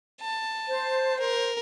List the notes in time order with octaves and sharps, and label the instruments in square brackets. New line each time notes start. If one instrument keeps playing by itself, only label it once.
[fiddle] A5
[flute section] C5
[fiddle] A#4